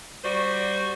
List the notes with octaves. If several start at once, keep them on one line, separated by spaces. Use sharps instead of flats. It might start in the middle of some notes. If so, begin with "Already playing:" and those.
G3 F#4 C5 D5